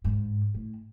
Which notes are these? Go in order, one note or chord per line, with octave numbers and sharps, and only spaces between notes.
G#2
A2